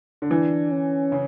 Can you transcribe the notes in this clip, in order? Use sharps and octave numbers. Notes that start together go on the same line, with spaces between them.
D3
E3 D4
C#4
C#3